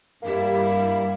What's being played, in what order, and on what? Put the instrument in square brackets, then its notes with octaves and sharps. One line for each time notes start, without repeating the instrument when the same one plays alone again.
[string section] G2 G3 E4 [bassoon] A#3